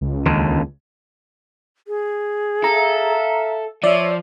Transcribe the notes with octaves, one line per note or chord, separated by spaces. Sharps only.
C#2
D#2 D3
G#4
A4 E5 F5 A#5
F3 C#5 D5 E5